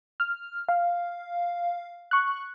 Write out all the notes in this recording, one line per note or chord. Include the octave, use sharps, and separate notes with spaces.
F6
F5
C#6 F#6